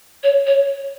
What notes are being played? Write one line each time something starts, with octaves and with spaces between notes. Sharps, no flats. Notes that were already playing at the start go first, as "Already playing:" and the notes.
C#5
C#5